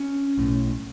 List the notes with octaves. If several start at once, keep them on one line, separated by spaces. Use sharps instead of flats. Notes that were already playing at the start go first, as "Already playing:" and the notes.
Already playing: C#4
B1 A2